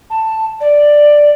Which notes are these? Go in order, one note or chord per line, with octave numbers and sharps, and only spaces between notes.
A5
D5